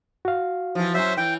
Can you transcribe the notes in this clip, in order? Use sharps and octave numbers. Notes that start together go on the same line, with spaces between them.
F#4 F5
E3 F3
F#3 C#4 C5 E5
E3 G5